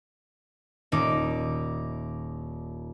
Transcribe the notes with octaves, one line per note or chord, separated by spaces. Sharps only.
D#1 D#4 D6